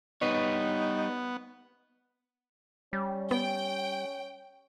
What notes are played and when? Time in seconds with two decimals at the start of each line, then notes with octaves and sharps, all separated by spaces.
0.21 G3 B3 D#4 B4 C#5
2.93 G3 C#4
3.31 B3 G5